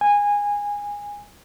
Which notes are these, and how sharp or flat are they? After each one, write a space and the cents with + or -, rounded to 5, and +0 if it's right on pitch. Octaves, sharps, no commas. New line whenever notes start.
G#5 -20